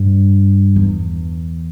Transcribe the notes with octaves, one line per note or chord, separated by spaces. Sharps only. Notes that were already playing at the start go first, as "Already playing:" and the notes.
Already playing: G2
E2